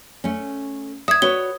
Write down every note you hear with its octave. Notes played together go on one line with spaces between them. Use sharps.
A3 C#4
E5 D#6 G#6
F#4 B4 C#5 G7